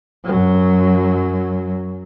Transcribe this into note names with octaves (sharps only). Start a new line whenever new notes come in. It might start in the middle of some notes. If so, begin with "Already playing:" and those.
F#2 F#3